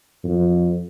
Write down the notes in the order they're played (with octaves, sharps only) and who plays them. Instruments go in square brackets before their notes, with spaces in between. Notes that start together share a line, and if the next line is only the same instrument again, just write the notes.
[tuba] F2